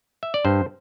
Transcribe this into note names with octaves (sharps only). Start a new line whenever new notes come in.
E5
D5
G2 C5